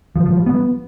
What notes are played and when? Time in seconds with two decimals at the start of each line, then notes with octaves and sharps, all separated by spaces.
0.16 F3
0.26 F3
0.36 G3
0.46 B3